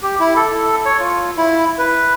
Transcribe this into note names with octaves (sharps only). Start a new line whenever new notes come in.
G4
E4
A4
C#5
F4
E4
B4